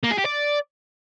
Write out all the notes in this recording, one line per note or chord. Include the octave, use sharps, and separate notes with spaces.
A#3
G#4
G4
D5